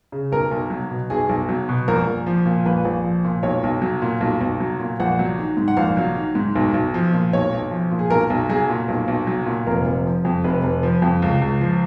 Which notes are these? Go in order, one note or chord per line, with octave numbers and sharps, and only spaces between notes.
C#3
B1 A#4
B1
F#3
B2
B1 G#4
B1
F#3
B2
A#1 A#4
A#1
F3
A#2
A#1 B4
A#1
F3
A#2
B1 C#5
B1
F#3
A#2
B1
B1
F#3
A#2
A#1 F#5
F#3
D#3
G#2
F#5
A#1 F5
F#3
D#3
G#2
B1
B1
F3
A#2
B1 C#5
B1
F3
A#2
G#4
B1 A#4
B1
F#3 G#4
A#2
B1
B1
F#3
A#2
F1 A#4
F1
F3
F2
F1 B4
F1
F3
F2
C#2
C#2
F3